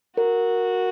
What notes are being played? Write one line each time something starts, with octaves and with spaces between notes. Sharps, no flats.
F#4 A#4